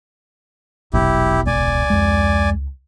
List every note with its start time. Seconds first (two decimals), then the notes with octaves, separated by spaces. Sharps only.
0.94 E1 A#1 B2 F#3 E4 G4
1.47 C#2 D5 G#5
1.90 F2 G#3